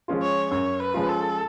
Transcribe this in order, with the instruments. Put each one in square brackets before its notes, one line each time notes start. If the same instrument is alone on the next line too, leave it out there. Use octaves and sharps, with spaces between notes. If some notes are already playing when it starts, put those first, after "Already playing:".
[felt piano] F3 G#3 C#4 F4
[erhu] C#5
[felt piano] F#2 [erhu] C#5
[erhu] B4
[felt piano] F3 G#3 C#4 F4
[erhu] A4